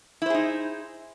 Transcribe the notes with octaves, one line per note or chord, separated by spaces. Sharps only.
D#4 E4 G#4 C5